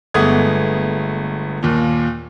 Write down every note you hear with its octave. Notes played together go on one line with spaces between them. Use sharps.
G1 G#3 A3 B3 D#6 G#6
D#2 A#2